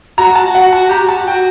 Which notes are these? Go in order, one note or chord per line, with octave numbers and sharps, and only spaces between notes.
F#4 A#5
A5
F#4
F#5
F#4 A5
G4 A#5
G4
F#4 A5
F#4 G5